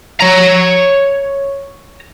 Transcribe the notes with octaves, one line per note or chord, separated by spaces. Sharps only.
C#5 A#5